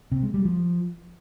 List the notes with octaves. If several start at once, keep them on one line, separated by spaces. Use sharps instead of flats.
C3
G#3
G3
F3